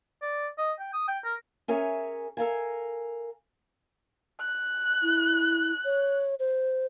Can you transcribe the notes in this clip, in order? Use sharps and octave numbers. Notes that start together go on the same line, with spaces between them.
D5
D#5
G5
D#6
G5
A#4
C#4 G#4 A#4 C#5 E5 G#5
A4 A#4 F5 G#5
F#6
E4
C#5
C5